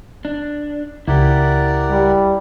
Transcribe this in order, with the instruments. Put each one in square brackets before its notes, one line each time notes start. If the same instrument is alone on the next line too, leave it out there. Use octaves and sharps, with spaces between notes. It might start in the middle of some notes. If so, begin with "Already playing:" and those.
[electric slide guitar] D4
[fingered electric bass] C#2 [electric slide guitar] E4 G4 [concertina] A#4 D5 F#5
[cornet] G3